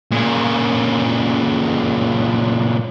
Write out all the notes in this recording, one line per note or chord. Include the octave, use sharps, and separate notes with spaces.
A#2 C#3